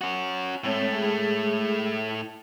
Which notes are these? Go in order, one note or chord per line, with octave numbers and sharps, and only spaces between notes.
C#4 F#4
A2 G#3 A3 C4 C#5
G#3 G#4